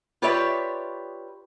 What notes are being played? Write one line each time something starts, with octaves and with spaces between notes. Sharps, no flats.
F4 G4 B4 C#5 D5 E5